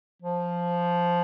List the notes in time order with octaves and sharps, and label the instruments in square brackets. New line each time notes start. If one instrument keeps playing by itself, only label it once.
[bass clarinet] F3